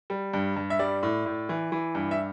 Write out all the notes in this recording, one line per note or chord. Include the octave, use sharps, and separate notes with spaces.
G3
G2
G2
E5
G3 D5
A2
A2
E3
E3
G2
E5